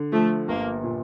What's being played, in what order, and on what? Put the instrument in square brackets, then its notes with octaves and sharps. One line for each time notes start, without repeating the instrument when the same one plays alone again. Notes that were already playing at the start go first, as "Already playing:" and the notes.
Already playing: [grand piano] D3
[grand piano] F3 [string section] A3
[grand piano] G1 [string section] A#3
[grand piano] A#2